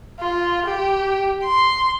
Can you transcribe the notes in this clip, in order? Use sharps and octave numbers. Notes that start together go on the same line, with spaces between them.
F4
G4
C6